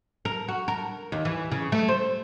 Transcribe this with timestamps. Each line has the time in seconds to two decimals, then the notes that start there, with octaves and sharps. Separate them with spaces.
0.25 A#4
0.48 F#4
0.68 A#4
1.12 D#2
1.25 E3
1.51 C#3
1.72 A3
1.89 C5